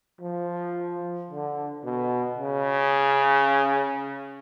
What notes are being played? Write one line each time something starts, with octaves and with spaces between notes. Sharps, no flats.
F3
D3
B2
C#3